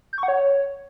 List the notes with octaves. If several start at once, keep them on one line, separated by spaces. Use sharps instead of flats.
G6
C#6
F#5
C#5